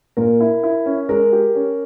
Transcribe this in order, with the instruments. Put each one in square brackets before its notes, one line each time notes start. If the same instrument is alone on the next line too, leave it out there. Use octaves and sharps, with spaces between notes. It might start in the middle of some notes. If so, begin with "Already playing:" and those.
[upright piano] A#2 [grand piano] A#4
[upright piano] E4
E4
C#4
[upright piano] G#3 [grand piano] A#4
[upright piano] G4
C#4